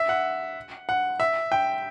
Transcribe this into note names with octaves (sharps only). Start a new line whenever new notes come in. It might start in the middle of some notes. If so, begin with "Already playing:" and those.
Already playing: E5
F#5
F#5
E5
G5